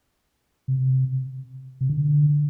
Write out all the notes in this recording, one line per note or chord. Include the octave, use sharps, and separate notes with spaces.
C3
C3
D3